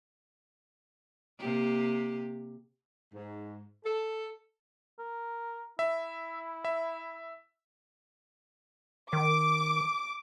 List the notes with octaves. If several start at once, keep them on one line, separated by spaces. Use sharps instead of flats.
C3 A#3 G4
G#2
A4
A#4
E4 E5
E5
D#3 D6